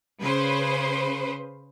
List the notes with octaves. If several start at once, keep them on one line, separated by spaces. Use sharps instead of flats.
C#3 B4 C5